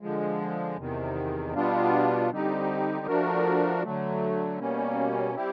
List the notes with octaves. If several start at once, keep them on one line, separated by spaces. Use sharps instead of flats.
D3 F3 G#3
E2 C3 D#3
B2 G3 B3 D4 F4
D3 G3 C4 D#4 G4
F3 A3 D4 F#4 A#4
D3 F#3 A3
B2 G3 A#3 C#4
G3 C4 E4 G4